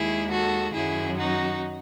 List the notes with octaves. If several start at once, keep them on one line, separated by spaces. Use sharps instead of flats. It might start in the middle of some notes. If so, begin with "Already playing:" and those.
Already playing: D#2 D#3 G#3 E4 G#4
F#4 A4
F#2 D#3 F#3 E4 G#4
D#4 F#4